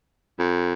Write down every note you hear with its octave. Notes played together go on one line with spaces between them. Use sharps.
F2